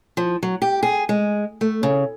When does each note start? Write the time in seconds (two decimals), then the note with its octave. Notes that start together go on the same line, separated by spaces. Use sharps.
0.17 F3
0.43 F#3
0.62 G4
0.83 G#4
1.09 G#3
1.61 A3
1.83 C#3